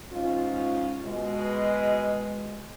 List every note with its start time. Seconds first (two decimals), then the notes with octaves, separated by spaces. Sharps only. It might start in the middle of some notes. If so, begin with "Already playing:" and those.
0.11 G#2 C#4 F4
1.04 B2 G#3